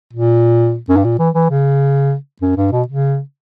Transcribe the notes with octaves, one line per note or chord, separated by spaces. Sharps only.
A#2
F#2
G2
A#2
E3
E3
C#3
F#2
G2
B2
C#3